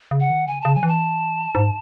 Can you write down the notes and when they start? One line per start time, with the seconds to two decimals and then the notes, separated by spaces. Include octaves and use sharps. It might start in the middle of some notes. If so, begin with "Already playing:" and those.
0.11 C#3
0.20 F#5
0.30 D#3
0.47 C#3 G#5
0.61 C#3 A5
0.75 F#3 G#5
0.83 E3
0.88 A5
1.55 G#2